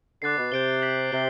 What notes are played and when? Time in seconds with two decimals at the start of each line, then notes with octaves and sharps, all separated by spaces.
0.22 D3 D6 F#6 A6 C7
0.37 B2
0.52 C3 G6 D7 G7
0.82 G6 B6 F#7
1.12 C3 C7 G7